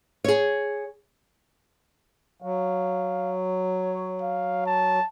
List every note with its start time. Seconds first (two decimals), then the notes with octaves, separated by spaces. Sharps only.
0.24 G#4 C#5
2.42 F#3 F5
3.42 C#5
4.22 F5
4.66 A5